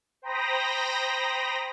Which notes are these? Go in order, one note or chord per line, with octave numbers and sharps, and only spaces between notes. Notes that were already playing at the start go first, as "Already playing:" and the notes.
C5 G5 A#5 B5 D#6 A#6